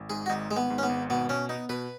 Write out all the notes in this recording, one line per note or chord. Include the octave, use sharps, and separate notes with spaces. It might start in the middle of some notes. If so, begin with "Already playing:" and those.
Already playing: G#1
G#2 G#4
F#4
G#1 D#4
G#1 G#3
B3
G#2
C#4
B3
G#1
B2 B3
B2 C#4
B3 D#4
B2 B4